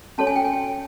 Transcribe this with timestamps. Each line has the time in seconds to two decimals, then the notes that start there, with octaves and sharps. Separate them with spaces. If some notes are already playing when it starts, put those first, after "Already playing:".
0.18 C#4 F#4 A4 C#5 A5
0.27 G#5
0.36 G5
0.45 G#5